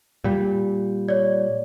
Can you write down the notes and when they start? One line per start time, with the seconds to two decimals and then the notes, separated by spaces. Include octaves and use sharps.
0.24 A#2 G3
1.08 C#5 D5